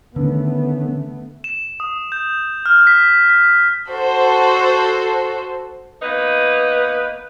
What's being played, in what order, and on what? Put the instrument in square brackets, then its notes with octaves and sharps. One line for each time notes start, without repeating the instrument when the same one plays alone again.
[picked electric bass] D3 [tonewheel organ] D#3 C#4 [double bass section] A3 B3
[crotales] E7
D#6
G6
F6
B6
B6
[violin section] F#4 A4 C5
[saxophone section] A#3 B3 D#4 B4